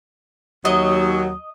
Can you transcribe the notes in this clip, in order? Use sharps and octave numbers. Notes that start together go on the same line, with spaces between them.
D#2 F#3 D#5